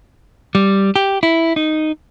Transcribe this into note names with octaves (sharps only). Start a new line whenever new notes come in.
G3
G4
E4
D#4